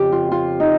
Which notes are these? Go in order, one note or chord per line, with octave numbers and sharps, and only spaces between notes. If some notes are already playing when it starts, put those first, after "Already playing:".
Already playing: F2 C#3 F3 G4
F4
F4
D#4